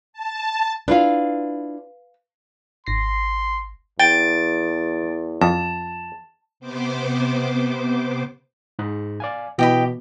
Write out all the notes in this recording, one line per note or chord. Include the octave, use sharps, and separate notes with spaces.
A5
D4 E4 F4 B4 F5
G#1 C6 A#6 C7
E2 G5 A6 D7
F2 A5
C3 B3 C5 D6
G#2 D#4 F#6
D5 F5 G#5
B2 E3 G4 D#5 B5